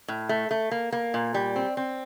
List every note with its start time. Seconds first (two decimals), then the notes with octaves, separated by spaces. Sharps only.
0.08 A2
0.29 A3
0.51 A3
0.71 A#3
0.92 A#3
1.14 A#2
1.34 G3
1.56 C4
1.77 C4